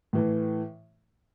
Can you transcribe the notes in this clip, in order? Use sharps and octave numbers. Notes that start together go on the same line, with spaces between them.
A2 E3 A3